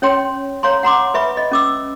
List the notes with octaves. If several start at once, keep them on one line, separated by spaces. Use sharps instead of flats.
C#4 C#5 G5 C6
C#5 F5 A#5 C6
F#5 A#5 C6 D6
B4 E5 B5 C#6
D#5
C#4 D6 E6